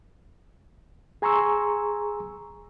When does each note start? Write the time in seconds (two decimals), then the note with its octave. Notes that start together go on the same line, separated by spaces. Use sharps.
1.22 G#4 G#5 A#5 C6 C#6 E6